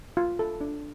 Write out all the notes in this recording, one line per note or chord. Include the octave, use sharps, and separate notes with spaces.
F4
A4
D4